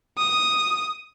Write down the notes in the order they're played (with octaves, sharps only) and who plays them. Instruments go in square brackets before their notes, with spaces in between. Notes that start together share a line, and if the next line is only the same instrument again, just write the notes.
[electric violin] D#6